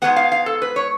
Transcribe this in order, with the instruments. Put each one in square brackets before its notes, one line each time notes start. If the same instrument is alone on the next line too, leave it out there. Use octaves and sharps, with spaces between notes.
[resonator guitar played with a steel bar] G#2 F3 G#3 B3 F#5
F5
F5
A4
B4
C#5